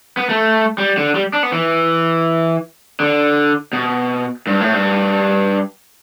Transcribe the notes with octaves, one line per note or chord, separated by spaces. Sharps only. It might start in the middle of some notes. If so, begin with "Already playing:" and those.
B3
A3
G3
D3
G3
D4
B3
E3
D3
B2
G2
A2
G2